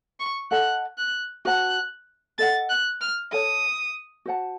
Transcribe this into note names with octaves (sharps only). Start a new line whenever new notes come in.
C#6
A4 D#5 F#5 A5 F#6
F#6
F#4 C5 F#5 A5 F#6
A4 D#5 F#5 A6
F#6
F6
A4 C#5 A5 D#6
F#4 C5 F#5 A5